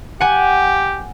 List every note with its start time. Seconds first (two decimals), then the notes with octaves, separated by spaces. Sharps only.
0.20 G4 F#5 G#5